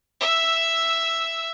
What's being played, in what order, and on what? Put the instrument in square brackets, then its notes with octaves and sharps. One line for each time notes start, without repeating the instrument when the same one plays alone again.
[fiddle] E5 E6